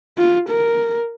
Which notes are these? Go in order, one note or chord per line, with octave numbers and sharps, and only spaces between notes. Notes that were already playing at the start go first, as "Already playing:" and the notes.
F4
A#4